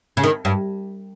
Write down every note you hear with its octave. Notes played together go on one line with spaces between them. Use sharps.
C#3
D#3
G2